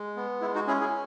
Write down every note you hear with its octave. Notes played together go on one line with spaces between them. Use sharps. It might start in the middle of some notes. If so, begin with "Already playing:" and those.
Already playing: G#3
B3
G#3 E4
D#4 F#4
C#4 E4 G#4
E4 G#4